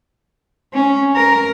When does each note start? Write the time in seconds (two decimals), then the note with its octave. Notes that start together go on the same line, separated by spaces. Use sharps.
0.73 C#4
1.15 A#4